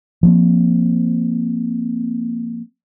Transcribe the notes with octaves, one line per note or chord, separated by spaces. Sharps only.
F3 A#3 C4